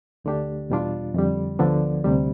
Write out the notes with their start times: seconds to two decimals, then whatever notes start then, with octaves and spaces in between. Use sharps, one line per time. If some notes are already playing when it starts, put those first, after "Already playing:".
0.25 D2 D3 A3 D4 G4
0.70 E2 B2 G3 D4 F4
1.14 F2 D3 G3
1.59 D2 D3 F3 B3 D4
2.04 D2 C3 G3